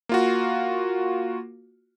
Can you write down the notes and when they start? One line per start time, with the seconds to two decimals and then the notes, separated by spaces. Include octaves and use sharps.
0.09 A#3 F4 F#4